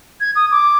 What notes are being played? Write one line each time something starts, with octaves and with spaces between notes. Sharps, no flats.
G#6
D#6
D6